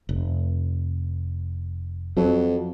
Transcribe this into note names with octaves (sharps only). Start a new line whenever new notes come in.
F1
F2 F#3